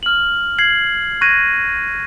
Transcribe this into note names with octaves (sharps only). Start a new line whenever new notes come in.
F6 F#7
G#6 C7 F#7
C#6 F#6 G#6 A#6 D#7